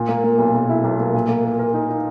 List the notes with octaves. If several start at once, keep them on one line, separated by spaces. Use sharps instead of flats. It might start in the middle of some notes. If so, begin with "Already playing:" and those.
Already playing: A#2
A#3
A#3
B1
B1
E4
B1
A#3
A#2
A#3
A#4
A#4
D#4
D#4